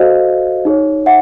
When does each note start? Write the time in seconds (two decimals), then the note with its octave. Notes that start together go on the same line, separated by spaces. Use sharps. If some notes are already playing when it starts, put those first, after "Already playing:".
Already playing: F#4 A4 C5 D#5 F5
0.65 D#4 G#4 C#5
1.06 E5 F#5